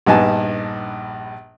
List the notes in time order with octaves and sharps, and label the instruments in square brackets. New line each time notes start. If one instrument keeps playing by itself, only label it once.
[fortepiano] A#1 G2 B3 D#4 G#5 A5